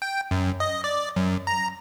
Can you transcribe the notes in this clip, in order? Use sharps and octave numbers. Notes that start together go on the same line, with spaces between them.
G5
F#2
D#5
D5
F#2
A#5